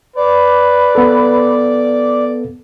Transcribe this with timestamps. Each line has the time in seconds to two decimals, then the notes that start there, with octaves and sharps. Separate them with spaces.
0.16 B4 D5
0.95 B3 A4